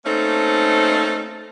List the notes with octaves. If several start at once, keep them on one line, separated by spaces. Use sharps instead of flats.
A3 A#3 C4 C#4 D#4 A4